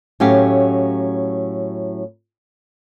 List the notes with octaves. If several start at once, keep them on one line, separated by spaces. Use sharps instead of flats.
A2 F#3 C#4 G4 C#5 F5